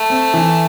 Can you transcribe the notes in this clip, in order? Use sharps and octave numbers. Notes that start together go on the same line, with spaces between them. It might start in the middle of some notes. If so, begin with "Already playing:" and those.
Already playing: A3
C4
E3